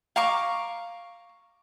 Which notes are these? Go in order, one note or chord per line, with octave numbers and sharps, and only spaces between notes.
F5 A#5 C#6 D6